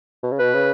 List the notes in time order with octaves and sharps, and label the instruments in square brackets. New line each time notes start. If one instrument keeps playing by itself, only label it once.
[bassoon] B2
C#3
[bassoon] B2 [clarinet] B4
[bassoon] C#3